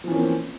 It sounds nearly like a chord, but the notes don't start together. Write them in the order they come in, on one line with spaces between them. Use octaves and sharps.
F3 E3 C#4 A#3 C4